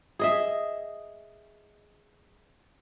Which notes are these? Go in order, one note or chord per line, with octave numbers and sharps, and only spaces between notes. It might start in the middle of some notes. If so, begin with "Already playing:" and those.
G#4 D#5 E5